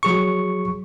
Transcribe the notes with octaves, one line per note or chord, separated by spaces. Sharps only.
F#3 G#4 C#6